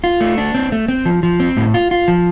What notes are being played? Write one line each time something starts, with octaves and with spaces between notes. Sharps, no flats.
F4
A3
D4
C4
A3
C4
F3
F3
C4
A2
F4
F4
F3